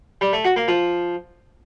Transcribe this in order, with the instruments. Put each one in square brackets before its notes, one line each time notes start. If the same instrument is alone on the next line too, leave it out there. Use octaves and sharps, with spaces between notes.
[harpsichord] G3
A3
F#4
A#3
F3